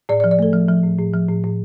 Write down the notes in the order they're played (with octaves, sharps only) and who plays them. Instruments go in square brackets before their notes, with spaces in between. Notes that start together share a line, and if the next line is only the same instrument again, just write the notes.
[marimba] A2 D5
D5
F3
D5
A3 A4
F3
F3
A2
A2
F3
A2
A2